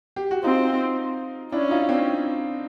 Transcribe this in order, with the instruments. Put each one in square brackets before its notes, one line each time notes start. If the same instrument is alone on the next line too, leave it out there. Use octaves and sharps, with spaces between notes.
[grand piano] G4
F#4
[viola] C4 [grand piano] D#4 F4
[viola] C#4 [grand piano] D4 E4
[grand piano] D#4 F4
C4 D4